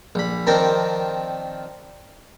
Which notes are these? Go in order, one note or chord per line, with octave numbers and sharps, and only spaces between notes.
A#1 B5
D#3 F3 C4 D4 A#4